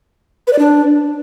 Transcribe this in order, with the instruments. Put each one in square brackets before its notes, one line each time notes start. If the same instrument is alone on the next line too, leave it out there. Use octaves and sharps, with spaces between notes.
[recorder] B4
D5
D4